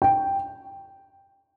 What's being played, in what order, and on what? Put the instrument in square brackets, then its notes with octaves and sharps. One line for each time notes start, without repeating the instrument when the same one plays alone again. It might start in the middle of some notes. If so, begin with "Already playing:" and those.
[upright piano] G5